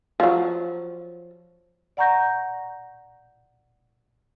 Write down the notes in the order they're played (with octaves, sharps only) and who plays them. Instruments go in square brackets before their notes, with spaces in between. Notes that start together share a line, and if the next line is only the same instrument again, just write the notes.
[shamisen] F3 F#3
[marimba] D5 F#5 A#5 C#6 G6 A#6